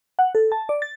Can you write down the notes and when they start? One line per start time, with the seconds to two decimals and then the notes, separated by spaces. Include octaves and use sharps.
0.19 F#5
0.35 A4
0.52 A5
0.69 D5
0.82 A6